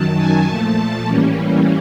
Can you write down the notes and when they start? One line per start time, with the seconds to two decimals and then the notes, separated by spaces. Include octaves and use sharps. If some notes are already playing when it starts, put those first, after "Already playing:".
Already playing: F#2 D#3 F#3 A5
0.17 G#5
0.46 A#2 F3 A3 A5
1.06 A2 E3 G3 A#3 C#4